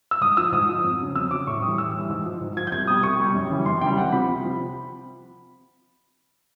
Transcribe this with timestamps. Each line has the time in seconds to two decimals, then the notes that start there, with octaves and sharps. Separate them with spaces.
0.11 E6
0.21 G#2 D#6
0.37 F3 E6
0.52 G#2 D#6
0.69 F3
0.84 F2
1.00 C#3 F#3
1.16 F2 E6
1.31 C#3 F#3 D6
1.47 A2 C#6
1.62 G3 D#6
1.67 E3
1.78 A2 E6
1.93 E3 G3
2.09 G#2
2.26 F3
2.41 G#2
2.57 F3 G#6
2.67 G6
2.72 C2 G#6
2.87 B2 G3 D#6
3.03 C2 C#6
3.20 B2 G3
3.35 F#2
3.50 C#3 E3 G3
3.66 F#2 C6
3.81 C#3 E3 G3 G5
3.97 C2 F#5
4.12 C3 F3 B5
4.29 C2
4.44 C3 F3